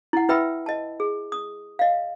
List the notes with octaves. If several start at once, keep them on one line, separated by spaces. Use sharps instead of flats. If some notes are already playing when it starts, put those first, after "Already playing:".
E4 F#5
E4 B4 E5 G5 B5 E6
D#5 A5
G#4
D#6
D#5 F5